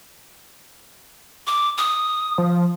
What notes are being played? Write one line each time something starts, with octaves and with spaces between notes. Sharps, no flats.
D6
D#6
F3